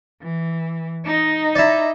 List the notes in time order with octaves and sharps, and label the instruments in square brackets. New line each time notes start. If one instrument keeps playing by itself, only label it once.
[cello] E3
D#4 D#5
[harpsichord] E4 D5